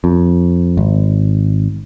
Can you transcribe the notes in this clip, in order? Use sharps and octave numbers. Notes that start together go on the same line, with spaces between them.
F2
G#1